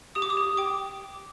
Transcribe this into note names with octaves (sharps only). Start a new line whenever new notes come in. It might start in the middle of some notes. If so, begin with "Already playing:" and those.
G4 D#6
D6
D#6
G4
G5 D6